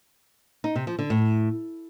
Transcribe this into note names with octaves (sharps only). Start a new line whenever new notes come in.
D#4
C3
F3
D3
A2